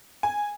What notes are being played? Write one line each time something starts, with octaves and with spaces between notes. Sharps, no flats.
G#5